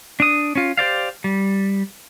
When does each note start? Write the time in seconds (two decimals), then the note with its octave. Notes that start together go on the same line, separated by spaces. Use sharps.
0.20 D4 D#6
0.55 C#4 F4
0.77 G4 C5 D5 F5
1.24 G3